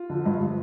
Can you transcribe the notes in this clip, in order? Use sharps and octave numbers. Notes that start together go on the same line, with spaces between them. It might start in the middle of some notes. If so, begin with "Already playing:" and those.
Already playing: F4
D3 F3
G2
F3